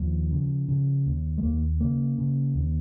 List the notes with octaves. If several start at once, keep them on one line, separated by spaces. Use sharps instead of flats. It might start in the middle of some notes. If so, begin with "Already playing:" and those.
Already playing: D#2 F3
C#3
C#3
D#2
G#3
D#2 A#3
C#3 A#3
C#3
D#2